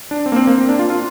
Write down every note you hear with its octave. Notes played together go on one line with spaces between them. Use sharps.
D4
C4
A#3
C4
A#3
C4
D4
F4
F4